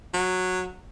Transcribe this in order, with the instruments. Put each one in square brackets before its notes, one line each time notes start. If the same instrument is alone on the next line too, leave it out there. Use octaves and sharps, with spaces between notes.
[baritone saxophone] F#3